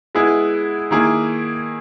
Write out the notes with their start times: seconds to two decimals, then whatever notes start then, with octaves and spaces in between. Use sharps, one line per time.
0.15 G#3 B3 E4 G#4
0.91 D#3 A#3 E4 G#4